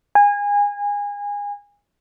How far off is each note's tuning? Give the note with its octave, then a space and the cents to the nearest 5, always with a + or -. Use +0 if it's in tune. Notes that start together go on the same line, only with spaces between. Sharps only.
G#5 -25